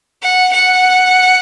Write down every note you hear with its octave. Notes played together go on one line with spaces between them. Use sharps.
F#5
F#5